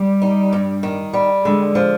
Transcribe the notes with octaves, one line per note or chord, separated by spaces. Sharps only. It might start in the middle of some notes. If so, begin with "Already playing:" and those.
Already playing: G3
D#4
G2
D#3
G3
D3 G#3
F3